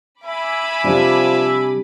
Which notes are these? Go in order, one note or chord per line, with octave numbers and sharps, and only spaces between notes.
E5 G#5 B5 D6
C3 F3 G3 D4